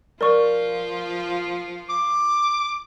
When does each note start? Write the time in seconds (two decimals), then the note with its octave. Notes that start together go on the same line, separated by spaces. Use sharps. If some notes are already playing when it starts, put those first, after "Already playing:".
0.21 F3 F4 A#4 D5 C#6
1.90 D6